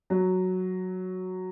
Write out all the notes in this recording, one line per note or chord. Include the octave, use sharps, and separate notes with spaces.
F#3